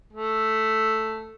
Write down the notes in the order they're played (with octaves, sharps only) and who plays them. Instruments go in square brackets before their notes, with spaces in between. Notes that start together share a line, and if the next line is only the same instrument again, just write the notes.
[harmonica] A3